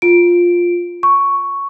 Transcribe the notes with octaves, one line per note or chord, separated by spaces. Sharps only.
F4 D7
C#6